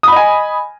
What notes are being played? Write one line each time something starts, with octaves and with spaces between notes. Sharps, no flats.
D#5 G#5 B5 D#6